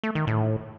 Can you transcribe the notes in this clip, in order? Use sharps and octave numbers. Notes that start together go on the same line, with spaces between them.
A3
D#3
A2